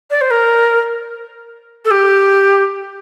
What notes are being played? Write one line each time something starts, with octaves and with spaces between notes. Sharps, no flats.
D5
C5
A#4
A4
G4